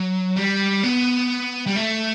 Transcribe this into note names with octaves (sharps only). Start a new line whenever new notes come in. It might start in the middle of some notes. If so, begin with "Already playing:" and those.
Already playing: F#3
G3
B3
G3
A3